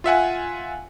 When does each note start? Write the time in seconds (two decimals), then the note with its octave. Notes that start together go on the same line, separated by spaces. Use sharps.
0.04 F4 E5 F#5 G#5